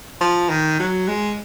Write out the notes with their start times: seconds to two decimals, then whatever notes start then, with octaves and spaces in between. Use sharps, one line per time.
0.21 F3
0.50 D#3
0.80 F#3
1.08 G#3